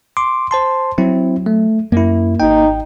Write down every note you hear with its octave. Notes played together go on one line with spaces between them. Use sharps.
C6 D6
C5 A5 C6
F#3 C4 E4
A3
F#2 A#3 E4
G#1 D#4 G5